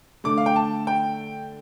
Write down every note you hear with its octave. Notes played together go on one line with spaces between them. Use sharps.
D3 A3 D6
F5
G5
A5
G5